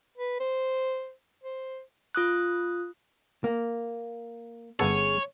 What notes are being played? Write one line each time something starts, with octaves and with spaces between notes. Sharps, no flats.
B4
C5
C5
F4 D#6 F#6
A#3
G1 B3 C#4 G#4 A4 C#5